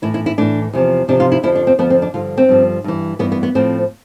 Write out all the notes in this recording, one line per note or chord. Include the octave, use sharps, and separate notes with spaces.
A2 E3 E4
E4
E4
A2 E3 D4
E2 C3 F3
E2 C3 F3 D4
F4
E4
F2 D3 F3 E4
D4
C4
F2 D3 F3 B3
C4
D4
G2 D3 F3 F4
C4
G2 D3 F3
G2 E3
G2 E3 B3
B3
B3
A2 F3 C4